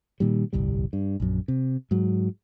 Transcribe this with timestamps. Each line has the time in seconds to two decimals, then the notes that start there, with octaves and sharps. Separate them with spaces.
0.20 A#2 D#3 G3
0.53 D1 G1 C2 G3
0.93 G2
1.20 A#1 F#2
1.48 C3
1.91 G#2 F#3